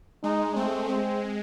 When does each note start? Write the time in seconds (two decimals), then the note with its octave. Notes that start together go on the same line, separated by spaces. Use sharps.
0.23 G#3 D#4
0.56 A3 C4
0.89 G#3 C4